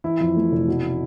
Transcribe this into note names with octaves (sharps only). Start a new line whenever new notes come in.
E3 E4
F2
A3
F1
B2